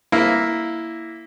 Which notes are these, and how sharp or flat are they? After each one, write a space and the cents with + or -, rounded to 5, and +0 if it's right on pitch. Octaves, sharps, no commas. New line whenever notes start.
A#3 +0 E4 +0